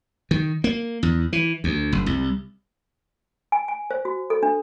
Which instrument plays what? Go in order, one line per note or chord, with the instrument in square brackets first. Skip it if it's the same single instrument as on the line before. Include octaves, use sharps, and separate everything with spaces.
[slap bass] D#3
A#3
E2
E3
D2
F#1
C2
[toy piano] G#5
G#5
C5
F#4
A4
D4